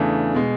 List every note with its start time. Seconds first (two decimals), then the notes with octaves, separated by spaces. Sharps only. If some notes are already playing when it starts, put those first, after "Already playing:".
Already playing: E2 C#3 E3 A3 D4
0.34 B2 G#3